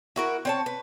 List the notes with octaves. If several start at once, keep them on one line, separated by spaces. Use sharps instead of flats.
E4 F#4 A#4
C4 C#5 A5
B4